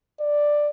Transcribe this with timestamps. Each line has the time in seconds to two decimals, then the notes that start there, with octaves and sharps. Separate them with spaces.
0.20 D5